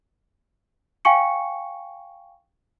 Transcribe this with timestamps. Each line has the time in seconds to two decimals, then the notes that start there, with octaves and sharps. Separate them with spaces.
1.05 F5 G5 G#5 C#6 C#7